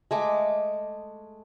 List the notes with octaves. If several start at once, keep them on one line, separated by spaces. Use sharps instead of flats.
G#3 A3 D6